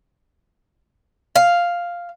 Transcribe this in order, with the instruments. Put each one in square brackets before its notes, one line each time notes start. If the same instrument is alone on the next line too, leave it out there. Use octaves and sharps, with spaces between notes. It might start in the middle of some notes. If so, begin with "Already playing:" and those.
[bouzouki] F5